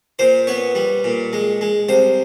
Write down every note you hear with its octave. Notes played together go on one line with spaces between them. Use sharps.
A#2 C5
B3 C#5
G3
A#2
G#3
G#3
C2 C5